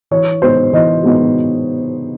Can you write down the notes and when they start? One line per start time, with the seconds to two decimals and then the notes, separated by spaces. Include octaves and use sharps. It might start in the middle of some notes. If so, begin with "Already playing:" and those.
0.11 E3 C#5
0.42 G#3 B3 D#4 C5
0.73 E3 D#5
1.03 G#3 B3 D#4